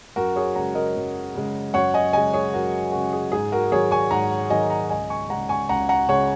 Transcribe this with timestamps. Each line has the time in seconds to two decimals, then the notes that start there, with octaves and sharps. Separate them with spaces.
0.16 F#2 F#4 A#4
0.36 G#4 C#5
0.55 C#3 G#3 F#5 A#5
0.75 A#4 D#5
0.96 F#2
1.35 C#3 G#3
1.74 F#2 C#5 F#5
1.94 D#5 G#5
2.13 C#3 G#3 D#5 G#5
2.33 G#4 C#5
2.53 F#2 F#4 A#4
2.92 C#3 G#3 F#4
3.13 G#4
3.32 G#2 G#4
3.52 F#4 A#4
3.72 D#3 F#3 G#4 C#5
3.91 G#5 C#6
4.11 G#2 F#5 A#5
4.50 D#3 F#3 D#5 G#5
4.70 F#5 A#5
4.90 C#2 D#5 G#5
5.10 G#5 C#6
5.30 C#3 G#3 F#5 A#5
5.49 G#5 C#6
5.69 C#2 F#5 A#5
5.89 F#5 A#5
6.08 C#3 G#3 C#5 F#5